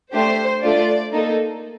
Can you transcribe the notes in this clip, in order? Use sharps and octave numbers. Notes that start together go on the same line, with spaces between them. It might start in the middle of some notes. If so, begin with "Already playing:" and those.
A3 D4 G4 C5
A3 D4 F4 D5
A#3 D#4 A4